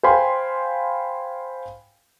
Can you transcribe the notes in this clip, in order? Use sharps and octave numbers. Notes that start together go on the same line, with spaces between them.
C5 F5 G5 G#5 B5 C6